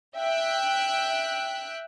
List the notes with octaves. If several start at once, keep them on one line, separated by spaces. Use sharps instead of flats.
E5 G5 F#6